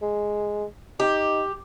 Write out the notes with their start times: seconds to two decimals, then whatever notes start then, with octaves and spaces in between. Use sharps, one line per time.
0.02 G#3
1.00 D#4 G4